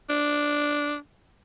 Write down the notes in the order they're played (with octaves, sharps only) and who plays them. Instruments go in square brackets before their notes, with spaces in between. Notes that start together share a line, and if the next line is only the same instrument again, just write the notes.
[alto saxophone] D4